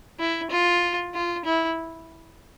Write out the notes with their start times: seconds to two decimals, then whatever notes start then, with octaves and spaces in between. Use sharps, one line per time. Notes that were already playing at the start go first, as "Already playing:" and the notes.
0.20 E4
0.51 F4
1.14 F4
1.45 E4